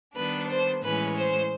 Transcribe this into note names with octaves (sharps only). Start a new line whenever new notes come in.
D#3 G3 B3 D4 B4
C5
A2 E3 G#3 C#4 B4
C5